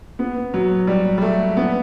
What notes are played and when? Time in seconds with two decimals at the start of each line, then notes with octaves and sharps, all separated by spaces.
0.19 B3
0.54 F#3
0.87 G3
1.18 G3
1.22 A3
1.57 B3